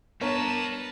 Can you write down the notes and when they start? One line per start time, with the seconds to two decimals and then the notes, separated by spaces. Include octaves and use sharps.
0.21 G2 B3 D4 A#4 B4 C#5 A5 A#5